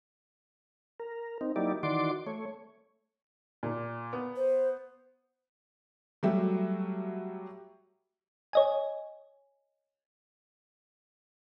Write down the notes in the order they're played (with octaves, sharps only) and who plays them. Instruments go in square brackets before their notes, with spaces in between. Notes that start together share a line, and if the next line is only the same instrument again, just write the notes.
[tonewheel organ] A#4
C4 D#4
F#3 A#3 D#4 E4 G4 D5
D#3 E3 F#4 D5 C6 D6
A3 C#5
[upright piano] A#2
B3
[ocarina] C5
[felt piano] F#3 G3 A3 F#4 G4 E5
[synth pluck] C#5 D#5 G#5